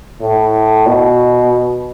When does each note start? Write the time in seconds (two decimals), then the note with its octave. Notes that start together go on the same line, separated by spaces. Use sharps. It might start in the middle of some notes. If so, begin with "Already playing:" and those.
0.21 A2
0.86 B2